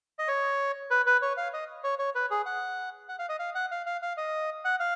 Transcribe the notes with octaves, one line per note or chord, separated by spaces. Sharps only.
D#5
C#5
B4
B4
C#5
F5
D#5
C#5
C#5
B4
G#4
F#5
F#5
F5
D#5
F5
F#5
F5
F5
F5
D#5
F#5
F5